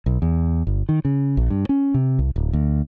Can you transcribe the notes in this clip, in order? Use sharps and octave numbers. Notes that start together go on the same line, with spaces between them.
B1
E2
G1
D#3
C#3
A#1
G2
C#4
C3
C2
D1
D2